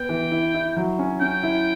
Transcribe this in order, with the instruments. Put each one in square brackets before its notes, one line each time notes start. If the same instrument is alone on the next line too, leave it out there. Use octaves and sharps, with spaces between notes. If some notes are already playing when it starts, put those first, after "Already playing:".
Already playing: [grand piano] B3 [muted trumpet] G5
[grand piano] E3
E4
E4
F#3
C#4
[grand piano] C#4 [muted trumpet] G5
[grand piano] E4